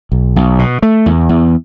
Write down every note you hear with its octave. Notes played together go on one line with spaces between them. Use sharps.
B1
B1
B2
A3
E2
E2